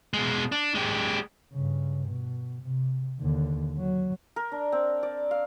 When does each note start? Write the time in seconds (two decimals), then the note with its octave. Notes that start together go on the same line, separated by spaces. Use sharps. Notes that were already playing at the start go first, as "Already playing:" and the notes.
0.13 B2 G#3
0.52 D4
0.75 G#3 G4
1.53 G2 C#3
2.08 B2
2.62 C3
3.20 D#2 D3
3.78 F#3
4.36 A#4
4.52 D4
4.72 C4
5.03 D5
5.31 F5